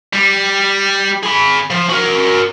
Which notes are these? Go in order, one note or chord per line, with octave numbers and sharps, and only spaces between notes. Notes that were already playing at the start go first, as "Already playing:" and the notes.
G3
G#4 B5
F3
F#4 A#4